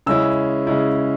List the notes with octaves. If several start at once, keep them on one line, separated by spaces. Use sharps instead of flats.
C#3 G#3 C#4 E4 E6
C#3 G#3 C#4 E4